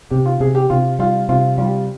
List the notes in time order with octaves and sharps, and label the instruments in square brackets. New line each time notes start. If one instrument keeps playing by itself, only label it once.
[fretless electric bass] C3 [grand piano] G4
[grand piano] F4
[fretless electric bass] C3 [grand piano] G#4
[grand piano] G4
[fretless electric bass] C3 [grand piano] F4
[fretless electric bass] G3 [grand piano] F4
[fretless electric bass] C3 [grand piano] F4
[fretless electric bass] G3 [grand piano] F4